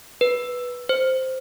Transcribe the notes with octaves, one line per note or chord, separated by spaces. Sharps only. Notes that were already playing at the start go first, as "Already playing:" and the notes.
B4
C5